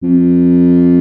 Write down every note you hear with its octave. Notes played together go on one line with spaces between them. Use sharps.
F2